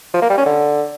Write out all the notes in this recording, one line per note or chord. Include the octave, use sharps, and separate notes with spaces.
F3
A#3
G3
C#4
D3